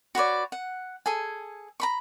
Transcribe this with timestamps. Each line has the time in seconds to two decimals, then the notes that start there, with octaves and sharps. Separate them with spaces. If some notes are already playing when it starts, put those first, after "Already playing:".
0.15 F#4 B4 C#5 D5
0.52 F#5
1.06 G#4 A4 G#5
1.80 A#5 B5 C#6